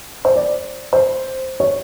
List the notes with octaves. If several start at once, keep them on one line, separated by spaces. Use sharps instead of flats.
C5
D5
C5
C#5